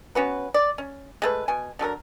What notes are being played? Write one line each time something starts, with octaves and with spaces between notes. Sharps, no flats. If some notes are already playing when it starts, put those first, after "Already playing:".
B3 C#4 F#4 B4
D5
C#4
G#3 A3 B4
B2 G#5
D3 F#3 A4 A#4